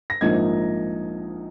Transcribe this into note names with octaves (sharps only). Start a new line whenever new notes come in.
A#6
A#1 G#2 F3 A#3 D#4 G#6